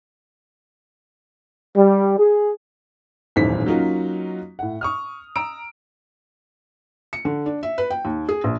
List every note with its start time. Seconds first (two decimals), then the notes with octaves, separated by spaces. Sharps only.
1.77 G3
2.18 G#4
3.36 D#1 B1 E2 G#2 C5 B6
3.66 F#3 A#3 C#4 D#4 F4 F#4
4.59 A2 F#5
4.81 C#6 D#6 F6
5.36 A#5 E6 D7
7.13 C#7
7.25 D3
7.46 D4
7.63 E5
7.78 B4
7.90 G5
8.05 D#2
8.29 G#4
8.44 A#1